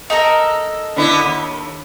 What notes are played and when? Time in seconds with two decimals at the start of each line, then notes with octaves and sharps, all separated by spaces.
0.10 D#4 A4 A#4
0.96 D3 B3 E4
1.25 D#2